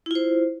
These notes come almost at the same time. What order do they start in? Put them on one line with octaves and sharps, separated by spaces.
E4 F4 C5